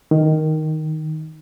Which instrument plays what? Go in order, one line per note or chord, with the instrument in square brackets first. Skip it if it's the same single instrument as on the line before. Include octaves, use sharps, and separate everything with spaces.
[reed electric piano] D#3